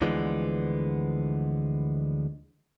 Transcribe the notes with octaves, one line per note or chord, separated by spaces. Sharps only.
D2 D3 E3 F3 G#3 B3